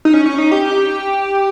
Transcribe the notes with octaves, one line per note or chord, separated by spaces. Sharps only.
D#4
C#4
C#4
D#4
G4